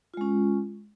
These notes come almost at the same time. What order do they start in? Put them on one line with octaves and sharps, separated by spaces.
F4 G#3 C#4